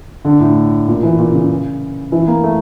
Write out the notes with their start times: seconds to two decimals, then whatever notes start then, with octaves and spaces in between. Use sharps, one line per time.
0.25 D3
0.40 A2
0.88 A#2
1.03 E3
1.19 A#2
1.34 C#3
2.12 E3
2.28 A#3
2.44 A3